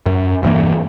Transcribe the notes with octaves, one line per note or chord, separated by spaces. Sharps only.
F#2
E1 G2 E3 A#3